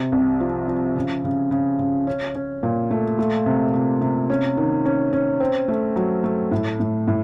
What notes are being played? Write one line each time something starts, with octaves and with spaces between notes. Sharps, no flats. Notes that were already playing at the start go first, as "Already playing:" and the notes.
Already playing: C3
C2
F3
F3
C#3
C#3
C#3
C#3
C#4
C#4
A#2
A3
A3
C3
C3
C3
C#4
D#3
C#4
C#4
C4
A3
F#3
A3
A2
A2
A2